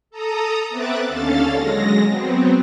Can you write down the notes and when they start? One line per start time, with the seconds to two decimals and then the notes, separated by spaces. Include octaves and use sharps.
0.11 A4 A#5 D#6
0.70 B3 C4 E5 D6 F#6 A6
1.09 D#2 D3 C#4 A4 F5 A6
1.56 F#3 G#3 A#6
2.06 F#3 B3 C4